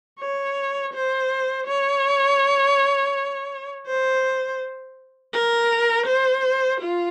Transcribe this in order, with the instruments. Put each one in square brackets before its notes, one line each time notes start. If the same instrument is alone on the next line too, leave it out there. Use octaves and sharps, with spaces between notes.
[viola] C#5
C5
C#5
C5
A#4
C5
F4